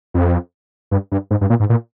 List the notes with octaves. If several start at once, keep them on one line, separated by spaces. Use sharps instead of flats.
F2
G2
G2
G#2
G2
A#2
G#2
A#2